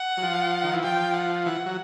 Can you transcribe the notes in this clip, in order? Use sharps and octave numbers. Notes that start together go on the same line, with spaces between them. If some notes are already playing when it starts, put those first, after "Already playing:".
Already playing: F#5
F#3
F3
D#3
E3
F3 G5
F#5
E3 F#5
F#3